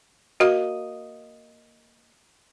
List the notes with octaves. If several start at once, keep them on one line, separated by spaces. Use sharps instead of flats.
A#3 F#4 D#5